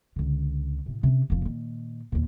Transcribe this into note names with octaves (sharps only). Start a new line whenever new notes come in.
C#2 D3
A2 C3
C3 C#4
F1 F3
A#2 D#3
D#2 A#2